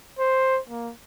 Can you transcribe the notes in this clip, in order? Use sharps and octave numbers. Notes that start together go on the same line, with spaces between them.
C5
A#3